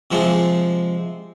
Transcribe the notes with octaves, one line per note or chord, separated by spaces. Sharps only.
C3 F3 G#3